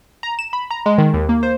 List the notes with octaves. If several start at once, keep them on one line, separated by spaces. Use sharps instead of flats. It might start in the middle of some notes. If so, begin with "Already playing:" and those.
A#5
E7
B5
A#5
G#3
D#3
D#2
A#3
C5